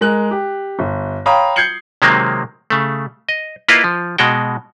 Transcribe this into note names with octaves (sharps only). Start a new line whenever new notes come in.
G#3 A#4 F#6
G4
G1
C#5 F5 G5 A#5 B5 D#6
G6 G#6 C7 C#7 F#7
C3 D#3 F#3 G#3 A#3 C4
C#3 A3
D#5
A#3 E4 F4 B4 D#5 F5
F3
B2 G#3 F#4 G5